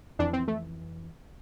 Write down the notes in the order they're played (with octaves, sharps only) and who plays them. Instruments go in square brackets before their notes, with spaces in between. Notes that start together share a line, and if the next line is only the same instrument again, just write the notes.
[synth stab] F2 E3 D4
C4
A3